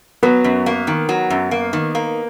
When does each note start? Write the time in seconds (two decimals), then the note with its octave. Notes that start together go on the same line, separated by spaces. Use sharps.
0.23 F#3 B3
0.44 F#2
0.66 A#3
0.87 D#3
1.09 F#3
1.30 F#2
1.51 A#3
1.73 D#3
1.95 A#3